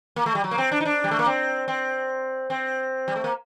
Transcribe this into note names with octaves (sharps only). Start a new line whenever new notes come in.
A#3
A3
G3
F#3
A#3
C4
D4
D#4
D4
G3
A3
A#3
C4
C4
C4
G3
A3
A#3